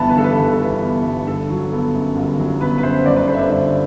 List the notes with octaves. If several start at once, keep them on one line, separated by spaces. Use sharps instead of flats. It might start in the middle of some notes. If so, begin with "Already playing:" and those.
Already playing: G1 E3 B3 A5 B5
B4
G2 A4
B4
G1 B4
A4
E3 B4
B3
G2
G1 A4
F#3 F#4
B3 A4
F#2
G1
F#3
B3 B4
B4
F#2 C5
G1 D5
B4
D3 C5
E5
D5
G1 E5